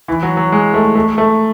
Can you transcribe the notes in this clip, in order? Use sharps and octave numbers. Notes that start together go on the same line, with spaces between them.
E3
F#3
F#3
G#3
A3
A3
A3